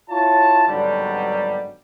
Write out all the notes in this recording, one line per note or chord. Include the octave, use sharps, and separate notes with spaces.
E4 F4 C#5 A5
G#1 G2 B2 D3 F#3 G3